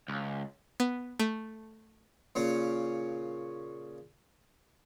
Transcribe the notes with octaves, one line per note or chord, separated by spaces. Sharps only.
C#2
B3
A3
A#2 C#3 C#4